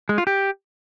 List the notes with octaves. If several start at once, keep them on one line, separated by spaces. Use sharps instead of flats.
G#3
F4
G4